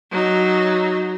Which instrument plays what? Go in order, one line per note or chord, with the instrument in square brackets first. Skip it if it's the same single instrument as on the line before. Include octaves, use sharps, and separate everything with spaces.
[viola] F#3 D#4